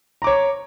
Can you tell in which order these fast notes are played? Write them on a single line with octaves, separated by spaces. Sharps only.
A#5 D6 C#5